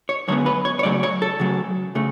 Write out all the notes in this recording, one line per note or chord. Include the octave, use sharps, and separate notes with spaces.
C#5
F#2 D3 G#3 B3 C#5
B4
C#5
C#5
C#3 F#3 A3 D5
C#5
A4
C#3 F#3 A3
C#3 A3